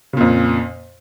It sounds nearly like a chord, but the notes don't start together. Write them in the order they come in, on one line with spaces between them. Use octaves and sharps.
C#3 A#2 F2